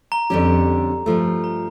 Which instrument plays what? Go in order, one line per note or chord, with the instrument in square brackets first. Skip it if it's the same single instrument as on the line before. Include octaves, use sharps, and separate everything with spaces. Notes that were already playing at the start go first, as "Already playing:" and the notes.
[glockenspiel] A#5
[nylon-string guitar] F2 D3 G3 C#4 G4
G2 F3 A3
[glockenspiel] A#5